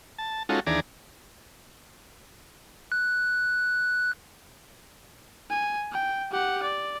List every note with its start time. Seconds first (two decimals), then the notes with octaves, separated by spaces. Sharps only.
0.18 A5
0.49 G#3 C#4 D#4 F4 F#4 A4
0.67 D#2 E3 D4 G#4 D5 A#5
2.92 F#6
5.50 G#5
5.93 G5
6.32 G4 F#5
6.63 D5